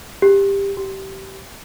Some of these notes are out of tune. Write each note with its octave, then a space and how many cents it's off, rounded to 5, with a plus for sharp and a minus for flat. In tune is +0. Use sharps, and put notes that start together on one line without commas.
G4 +15
G4 -25